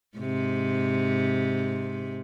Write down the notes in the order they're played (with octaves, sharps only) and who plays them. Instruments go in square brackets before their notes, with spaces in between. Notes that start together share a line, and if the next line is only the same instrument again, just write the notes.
[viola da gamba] G#2 C3